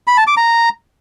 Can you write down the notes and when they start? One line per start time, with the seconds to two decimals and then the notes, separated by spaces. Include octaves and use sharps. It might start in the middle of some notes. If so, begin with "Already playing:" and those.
0.07 B5
0.17 A5
0.27 D6
0.37 A#5